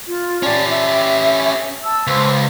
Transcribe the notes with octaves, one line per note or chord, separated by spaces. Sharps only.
F4
C#4 G4 D5 A5
E5
A5 E6
C#2 C5